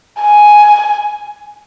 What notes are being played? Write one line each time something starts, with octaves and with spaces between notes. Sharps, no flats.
G#5